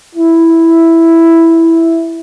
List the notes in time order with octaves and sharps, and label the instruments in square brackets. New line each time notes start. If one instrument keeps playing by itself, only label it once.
[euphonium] E4